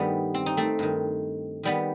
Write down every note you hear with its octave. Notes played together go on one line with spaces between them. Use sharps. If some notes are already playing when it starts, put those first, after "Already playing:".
Already playing: G2 D#3 G3 A3 B3
C4
D#4
A3 C4
G2 D#3
D#3 G3 B3